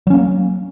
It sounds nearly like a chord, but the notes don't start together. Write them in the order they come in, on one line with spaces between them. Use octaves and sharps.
F#3 C#4 A#3